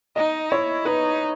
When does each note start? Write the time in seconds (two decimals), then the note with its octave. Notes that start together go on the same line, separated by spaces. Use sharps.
0.16 D#4 D#5
0.51 E4 C#5
0.85 D#4 B4